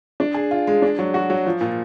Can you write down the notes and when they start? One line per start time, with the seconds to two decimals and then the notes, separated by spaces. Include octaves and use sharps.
0.20 D4
0.34 G#4
0.51 F4
0.67 G#3
0.82 D4
0.99 F#3
1.14 F#4
1.30 F#3
1.46 F3
1.61 A#2